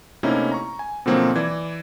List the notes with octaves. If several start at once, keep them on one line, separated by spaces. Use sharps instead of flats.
C3 A3 A#3 C#4 D#4 E4
A#5 C#6
G#5
B2 D3 F3 F#3 A#3 C4
E3 D5 G#6